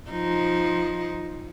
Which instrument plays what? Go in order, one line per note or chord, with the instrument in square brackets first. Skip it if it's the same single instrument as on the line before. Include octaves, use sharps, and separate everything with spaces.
[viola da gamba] F3 D#4